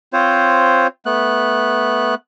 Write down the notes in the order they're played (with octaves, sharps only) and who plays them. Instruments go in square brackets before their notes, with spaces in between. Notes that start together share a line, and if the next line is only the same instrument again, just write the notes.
[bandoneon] C4 F4 C5 C#5
A3 B3 F#6